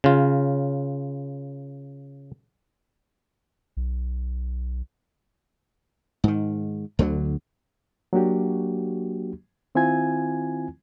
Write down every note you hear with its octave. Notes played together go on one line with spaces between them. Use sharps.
C#3 F4
B1
G#2 D#3
D2 D3 E3 F#3
F#3 A#3 D4 F#4 G4
D#3 C4 E4 F4 G#5 G#6